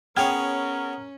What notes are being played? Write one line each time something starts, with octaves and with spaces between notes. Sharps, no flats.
B3 C#4 G#4 A#4 C#5 G5 F6 G#6